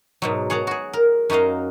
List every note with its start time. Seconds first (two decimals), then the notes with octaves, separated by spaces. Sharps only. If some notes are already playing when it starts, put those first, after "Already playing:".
0.22 G#2 B2 F#3
0.50 G#4 C#5 F#5 A5 A#5
0.67 F#4 G#4
0.93 A#4
1.30 F#2 D#4 F#4 D#5 F5